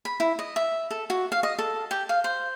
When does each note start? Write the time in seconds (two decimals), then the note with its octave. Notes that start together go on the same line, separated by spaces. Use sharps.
0.05 B5
0.20 E4
0.39 D#5
0.56 E5
0.91 A4
1.10 F#4
1.32 F5
1.43 D#5
1.59 A4
1.91 G4
2.09 F5
2.24 C5